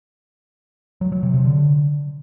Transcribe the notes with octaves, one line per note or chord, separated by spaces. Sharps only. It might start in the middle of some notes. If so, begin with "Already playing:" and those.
F#3
F#3
C3
C3
D3